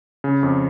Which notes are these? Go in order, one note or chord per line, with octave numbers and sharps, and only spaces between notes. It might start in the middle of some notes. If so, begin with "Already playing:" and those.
C#3
F2